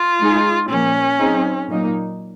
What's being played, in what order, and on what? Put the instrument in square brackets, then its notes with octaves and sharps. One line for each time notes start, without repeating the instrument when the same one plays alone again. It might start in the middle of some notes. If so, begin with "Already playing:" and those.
Already playing: [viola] F4
[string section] G#3 D#4 G#4
[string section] A#2 F3 A#3 [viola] C#4
[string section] F#3 C4 D#4 G#4
A#2 F#3 A#3 D#4